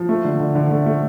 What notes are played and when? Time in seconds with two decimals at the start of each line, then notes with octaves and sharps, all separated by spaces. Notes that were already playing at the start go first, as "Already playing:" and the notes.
Already playing: F3
0.09 A3
0.24 D3
0.40 D3
0.55 D3
0.71 A3
0.86 A3